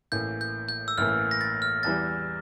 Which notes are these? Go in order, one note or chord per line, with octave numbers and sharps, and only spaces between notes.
A1 A2 E3 A#3 G6
G6
G6
E6
A1 A2 E3 A#3 F6
A#6
A6
F6
E2 E3 G3 A6